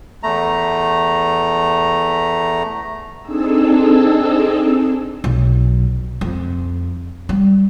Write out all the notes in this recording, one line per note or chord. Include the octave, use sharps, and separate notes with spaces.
E2 A3 A#5
C4 D4 D#4 G#4 A4 E6
B1
F2
G3